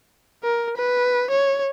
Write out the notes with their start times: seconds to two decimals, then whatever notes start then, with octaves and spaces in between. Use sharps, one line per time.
0.44 A#4
0.77 B4
1.30 C#5